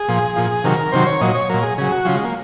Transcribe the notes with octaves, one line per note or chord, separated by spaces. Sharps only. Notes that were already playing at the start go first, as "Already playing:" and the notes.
Already playing: G#4
A#2 F3
A#2 F3
C3 D#3 F#3 A#4
C3 D#3 F#3 C5
C#5
A#2 F#3 D#5
C#5
A#2 F#3 A#4
G#4
C#3 F#3 G#4
F#4
C#3 F#3 F4
G#3
A#3